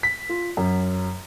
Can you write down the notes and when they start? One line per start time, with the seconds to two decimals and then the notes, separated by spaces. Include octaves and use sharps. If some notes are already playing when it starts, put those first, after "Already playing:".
0.03 B6
0.29 F4
0.57 F#2